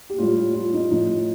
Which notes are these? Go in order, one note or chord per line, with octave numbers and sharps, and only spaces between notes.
G4
A2 G3 F4
F4
D#4
A2 F3 D#4